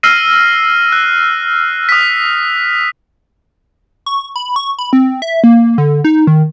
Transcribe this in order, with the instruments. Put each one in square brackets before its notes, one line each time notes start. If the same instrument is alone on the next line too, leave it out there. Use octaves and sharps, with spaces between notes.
[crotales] E6 F6 A#6 C7 D#7
F#6
D#6 B6
[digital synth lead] C#6
B5
C#6
B5
C4
E5
A#3
D3
D#4
D#3